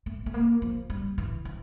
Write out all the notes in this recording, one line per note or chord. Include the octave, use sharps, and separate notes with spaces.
A3
A3
A#3
F3
G3
E3
E3